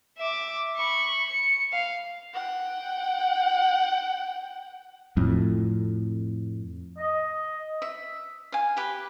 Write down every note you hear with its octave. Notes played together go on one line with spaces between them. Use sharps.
E5 D6
B5 C#6
C#7
F5
F#5 G5
F2 A2
D#5
E5
F5 G#5
G4 B4